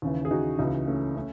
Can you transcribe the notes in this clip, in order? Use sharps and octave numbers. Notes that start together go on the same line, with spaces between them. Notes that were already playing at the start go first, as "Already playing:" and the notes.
D#2 C#3 E3
G#4
D#4 F#4
C#2 C#3 E3 D#4 F#4
A3 C#4
A3 C#4